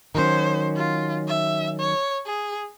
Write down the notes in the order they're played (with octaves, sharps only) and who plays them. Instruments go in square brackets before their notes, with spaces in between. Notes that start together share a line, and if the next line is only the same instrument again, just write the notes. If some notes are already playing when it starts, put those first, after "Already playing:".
[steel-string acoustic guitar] D#3 F#3 C#4 [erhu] C5
[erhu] F4
E5
C#5
G#4